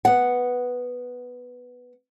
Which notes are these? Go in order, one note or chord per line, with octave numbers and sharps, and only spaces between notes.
B3 F#5